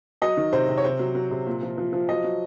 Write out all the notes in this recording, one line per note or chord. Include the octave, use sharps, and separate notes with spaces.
F#3 D#5
D#3
C3 C5
C3
C#5
C3 C5
F#3
F#3
C3
A#2
F3
F3
F3
F#3 D#5
F#3